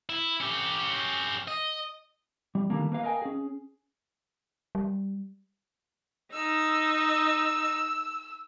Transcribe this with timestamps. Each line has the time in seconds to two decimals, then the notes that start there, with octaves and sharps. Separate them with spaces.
0.09 E4
0.40 C#4 G4
1.48 D#5
2.55 G3
2.70 D3 D#3 G3 A3 A#3
2.92 A#3 B4 F5
3.03 A#4 D#5 F5 G5 G#5
3.22 C#4 G#4
4.75 G3
6.33 D#4 E6